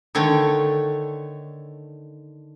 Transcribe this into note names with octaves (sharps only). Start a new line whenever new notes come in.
D3 D#3 A3 C#5